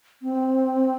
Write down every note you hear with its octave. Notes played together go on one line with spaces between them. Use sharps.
C4